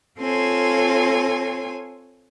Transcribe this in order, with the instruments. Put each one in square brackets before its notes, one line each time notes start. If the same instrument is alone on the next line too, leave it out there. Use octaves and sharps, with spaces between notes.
[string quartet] C4 F4 A4 C#5 G#5 C6